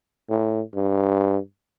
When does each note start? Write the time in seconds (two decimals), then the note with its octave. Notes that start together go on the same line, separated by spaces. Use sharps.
0.30 A2
0.74 G2